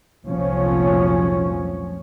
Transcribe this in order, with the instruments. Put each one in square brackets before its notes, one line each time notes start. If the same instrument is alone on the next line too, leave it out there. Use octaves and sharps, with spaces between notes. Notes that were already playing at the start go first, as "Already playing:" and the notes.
[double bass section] F1 C2 A#2 F3 F#3 C#4